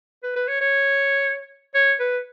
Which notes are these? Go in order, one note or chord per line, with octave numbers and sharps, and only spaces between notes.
B4
B4
C#5
C#5
C#5
B4